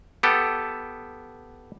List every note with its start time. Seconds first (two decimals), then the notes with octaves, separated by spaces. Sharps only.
0.23 B3 G4 A4